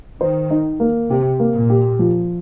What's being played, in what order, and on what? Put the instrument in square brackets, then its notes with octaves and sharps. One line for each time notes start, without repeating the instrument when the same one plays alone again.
[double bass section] D#3 [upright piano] C5
[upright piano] D#4
A#3
[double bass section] C3 [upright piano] G4
[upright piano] A#3
[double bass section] A#2
[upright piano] G4
F3